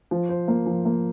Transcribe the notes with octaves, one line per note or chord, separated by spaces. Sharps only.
F3
C5
A#3
F3
A#3